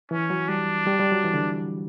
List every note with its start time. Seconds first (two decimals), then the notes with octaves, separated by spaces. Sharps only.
0.11 E3 C#4
0.30 F#3
0.48 G3 D4
0.87 G3
0.99 G3
1.12 F#3
1.24 E3
1.34 D3